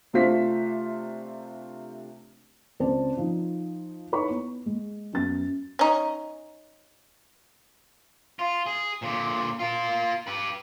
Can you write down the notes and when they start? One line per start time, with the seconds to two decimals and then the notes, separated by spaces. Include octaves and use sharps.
0.13 C3 A3 D4 F4 C5 B6
2.80 C#2 C4 C5 D5 A5
3.17 F3 D#4
4.12 D#4 E4 B4 C#5 B5 C#6
4.29 B3
4.66 G#3
5.13 F#2 B3 A6
5.79 C#4 D#4
8.39 F4
8.66 G#4
9.02 A#2 D3
9.59 F4 A#4
10.27 G4 B4